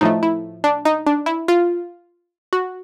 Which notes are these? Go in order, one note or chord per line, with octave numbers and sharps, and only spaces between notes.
A2 F3 A3 D#4
E4
D4
D#4
D4
E4
F4
F#4